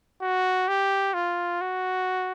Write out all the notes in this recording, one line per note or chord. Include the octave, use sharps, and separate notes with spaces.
F#4
G4
F4
F#4